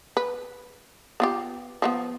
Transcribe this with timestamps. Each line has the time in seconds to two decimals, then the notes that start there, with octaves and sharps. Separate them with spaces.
0.17 B4
1.20 B3 F4 G4
1.82 F3 G3 B3